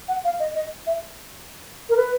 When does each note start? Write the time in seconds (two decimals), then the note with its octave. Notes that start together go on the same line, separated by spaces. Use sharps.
0.08 F#5
0.24 F5
0.40 D#5
0.55 D#5
0.87 E5
1.89 A#4
1.97 B4